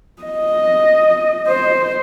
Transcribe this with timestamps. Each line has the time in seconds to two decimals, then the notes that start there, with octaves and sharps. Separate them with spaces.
0.23 D#5
1.47 C5